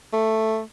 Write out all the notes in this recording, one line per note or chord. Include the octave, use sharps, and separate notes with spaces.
A3